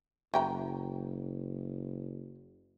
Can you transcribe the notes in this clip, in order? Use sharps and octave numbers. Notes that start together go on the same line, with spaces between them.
F#1 F#3 G5 A#5